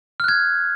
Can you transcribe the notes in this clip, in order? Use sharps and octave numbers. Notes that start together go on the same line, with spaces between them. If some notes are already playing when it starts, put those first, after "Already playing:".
F6 F#6 G#6